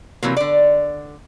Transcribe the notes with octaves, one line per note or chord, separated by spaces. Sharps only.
C3 E3 F#3 A#3
D3 D5